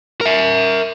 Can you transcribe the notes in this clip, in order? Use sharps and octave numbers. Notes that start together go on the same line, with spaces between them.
A#4 E5